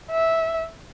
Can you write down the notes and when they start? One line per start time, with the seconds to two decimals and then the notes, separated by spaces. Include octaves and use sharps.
0.11 E5